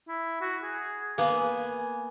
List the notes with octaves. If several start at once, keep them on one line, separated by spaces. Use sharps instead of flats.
E4
F#4
G#4
A#3 B3 G#5